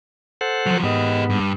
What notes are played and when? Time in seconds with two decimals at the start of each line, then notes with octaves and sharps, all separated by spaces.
0.41 A4 C5 F#5
0.66 F3 F#3
0.83 G#2 B3 G4 D#5
1.30 G2